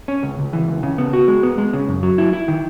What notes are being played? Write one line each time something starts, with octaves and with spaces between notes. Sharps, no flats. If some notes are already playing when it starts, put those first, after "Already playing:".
C#4
C#2
C#2
E3
C#2
C#3
B3
F#4
G#3
B3
G#3
C#3
F#2
F#3
E4
E4
D#3